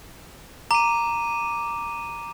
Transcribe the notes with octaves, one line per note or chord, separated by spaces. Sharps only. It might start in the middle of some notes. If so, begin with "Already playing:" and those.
A#5 D6 D#7